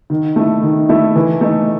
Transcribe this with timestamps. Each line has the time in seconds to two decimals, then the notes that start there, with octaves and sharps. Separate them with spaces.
0.10 D#3
0.36 A3 E4
0.63 D#3
0.89 A3 E4
1.16 E3
1.41 A3 D#4